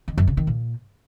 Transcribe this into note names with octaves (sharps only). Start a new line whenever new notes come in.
D#3
F#2
C#3
D#3
A#2